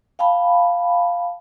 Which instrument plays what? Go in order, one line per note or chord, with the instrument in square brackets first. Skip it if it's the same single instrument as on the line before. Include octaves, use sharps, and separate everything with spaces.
[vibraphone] F5 G5 A5 B5